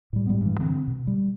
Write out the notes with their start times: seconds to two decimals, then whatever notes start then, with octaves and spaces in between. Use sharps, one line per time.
0.13 A2 G3
0.27 A2 G3 G#3 B3
0.41 G2 E3
0.59 D3 C4
0.88 B2
1.07 G3